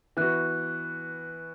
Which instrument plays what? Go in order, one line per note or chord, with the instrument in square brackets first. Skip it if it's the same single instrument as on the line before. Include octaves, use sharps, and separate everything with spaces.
[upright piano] E3 B3 F#4 [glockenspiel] F#6